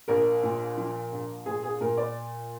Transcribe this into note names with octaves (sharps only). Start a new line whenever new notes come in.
A#1 A#4
A#2
F3
A#1
A#2 G#4
G#4
A#2 A#4
D5